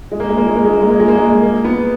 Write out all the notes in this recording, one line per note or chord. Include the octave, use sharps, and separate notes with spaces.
G#3
A#3
G#3
A#3
G#3
A#3
G#3
A#3
G#3
A#3
G#3
A#3
G#3
A#3
B3